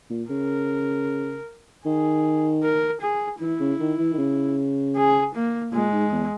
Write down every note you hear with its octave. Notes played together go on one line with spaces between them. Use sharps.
A#2
C#3 A#4
D#3 G#4
A#4
G#4
E3 E4
C#3
D#3
E3
D#3
C#3
G#4
A#3
A#2 G#3
G#2
E2